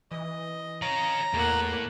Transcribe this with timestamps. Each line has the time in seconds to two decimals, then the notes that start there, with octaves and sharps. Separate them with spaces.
0.12 E3 D#5
0.82 C#5 F5 A#5
1.34 E2 A2 A#3 F#5